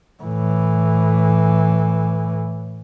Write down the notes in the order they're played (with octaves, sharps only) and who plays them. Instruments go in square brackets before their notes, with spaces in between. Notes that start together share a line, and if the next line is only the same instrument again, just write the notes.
[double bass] A2 E3